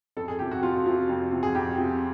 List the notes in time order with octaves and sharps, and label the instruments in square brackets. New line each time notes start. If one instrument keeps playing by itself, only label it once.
[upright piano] F2 A4
G#4
C3 F3 G4
F#4
F2 F4
C3 F3
F2
C3 F3
G#4
F2 G4
C3 F3